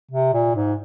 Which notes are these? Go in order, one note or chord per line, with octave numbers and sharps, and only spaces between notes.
C3
A#2
G#2